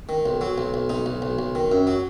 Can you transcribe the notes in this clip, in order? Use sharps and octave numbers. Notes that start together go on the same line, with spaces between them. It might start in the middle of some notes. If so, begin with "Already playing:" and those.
D#3
B1
F#3
B1
B1
B1 D#4
B1
B1
B1
D#3
F#2
F#3